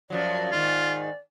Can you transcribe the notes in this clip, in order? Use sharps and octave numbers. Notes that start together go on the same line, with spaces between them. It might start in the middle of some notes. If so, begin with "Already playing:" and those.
F#2 F3 F#3 D5
G#2 D#3 F4